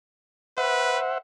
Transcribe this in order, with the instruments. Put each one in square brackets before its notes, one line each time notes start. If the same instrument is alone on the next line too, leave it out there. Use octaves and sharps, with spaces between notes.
[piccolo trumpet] B4 [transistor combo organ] C5 E5 F#5